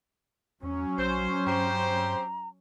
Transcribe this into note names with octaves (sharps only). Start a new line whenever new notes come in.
E2 F#3 C#4
A#1 C5
G2 C4 G4 C5 A#5